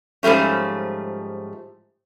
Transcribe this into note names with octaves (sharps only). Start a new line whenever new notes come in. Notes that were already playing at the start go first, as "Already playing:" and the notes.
G#2 F3 G3 A3 C#4